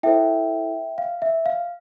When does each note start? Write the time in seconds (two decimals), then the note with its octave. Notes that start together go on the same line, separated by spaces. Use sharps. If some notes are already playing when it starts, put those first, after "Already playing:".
0.03 E4 A4 C5 E5 G5
0.98 F5
1.22 E5
1.46 F5